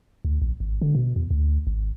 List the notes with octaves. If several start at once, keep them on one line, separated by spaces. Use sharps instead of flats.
D2
A#1
G#1
D3
B2
E2
D2
G#1